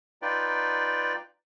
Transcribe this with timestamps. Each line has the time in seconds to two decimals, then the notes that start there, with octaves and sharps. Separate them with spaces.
0.22 D#4 F4 B4 D5 G5